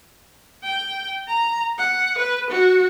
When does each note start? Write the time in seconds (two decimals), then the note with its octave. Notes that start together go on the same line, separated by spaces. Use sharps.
0.63 G5
1.28 A#5
1.78 F#5
2.18 B4
2.50 F#4